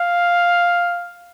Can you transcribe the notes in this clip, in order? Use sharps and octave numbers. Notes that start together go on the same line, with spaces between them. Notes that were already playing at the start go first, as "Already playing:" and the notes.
Already playing: F5